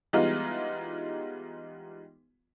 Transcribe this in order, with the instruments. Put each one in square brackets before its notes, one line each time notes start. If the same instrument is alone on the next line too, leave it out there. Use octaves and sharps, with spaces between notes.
[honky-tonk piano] E3 G3 G#3 B3 D#4 F4